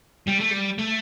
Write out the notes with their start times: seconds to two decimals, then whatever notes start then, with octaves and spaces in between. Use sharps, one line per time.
0.28 G3
0.40 A3
0.51 G3
0.78 A3